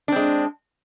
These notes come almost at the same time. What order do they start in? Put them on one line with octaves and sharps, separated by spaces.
D4 C4 G#3